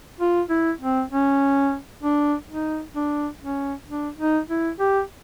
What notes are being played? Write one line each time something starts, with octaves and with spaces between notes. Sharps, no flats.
F4
E4
C4
C#4
D4
D#4
D4
C#4
D4
D#4
E4
G4